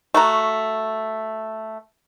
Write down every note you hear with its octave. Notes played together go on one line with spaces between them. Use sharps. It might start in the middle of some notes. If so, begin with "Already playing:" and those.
A3 F#4 A#5